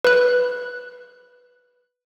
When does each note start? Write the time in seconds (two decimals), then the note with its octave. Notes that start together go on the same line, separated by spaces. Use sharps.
0.05 B4 F#6